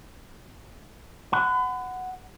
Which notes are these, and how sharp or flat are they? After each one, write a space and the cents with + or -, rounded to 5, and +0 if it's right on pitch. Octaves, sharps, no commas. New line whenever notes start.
F#5 +0 B5 +40